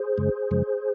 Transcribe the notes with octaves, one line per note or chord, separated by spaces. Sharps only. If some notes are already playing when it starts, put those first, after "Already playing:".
Already playing: G#4 C5
F#2 C#3 G#3
F#2 C#3 F3 G#3